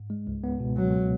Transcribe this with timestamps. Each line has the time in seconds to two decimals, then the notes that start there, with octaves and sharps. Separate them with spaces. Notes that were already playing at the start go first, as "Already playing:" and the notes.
Already playing: G#2
0.10 G#3
0.27 C#2
0.43 B3
0.60 B2
0.76 C#2 F#3